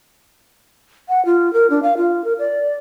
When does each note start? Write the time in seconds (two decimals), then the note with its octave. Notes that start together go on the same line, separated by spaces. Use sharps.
1.09 F#5
1.25 F4
1.53 A#4
1.70 D4
1.83 F5
1.97 F4
2.24 A#4
2.39 D5